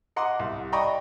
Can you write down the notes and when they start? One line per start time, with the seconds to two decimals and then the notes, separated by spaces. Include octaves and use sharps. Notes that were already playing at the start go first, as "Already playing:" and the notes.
0.16 D#5 F#5 A#5 C6 D6
0.39 C2
0.72 D5 D#5 G5 A#5 B5 C#6